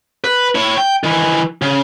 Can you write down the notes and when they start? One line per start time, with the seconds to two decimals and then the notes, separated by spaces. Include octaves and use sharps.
0.24 B4
0.55 E4 C#5
0.78 G5
1.04 D#3 E3
1.62 C#3